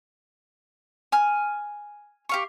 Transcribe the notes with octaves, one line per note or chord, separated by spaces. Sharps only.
G#5 F6
G4 F5 C#6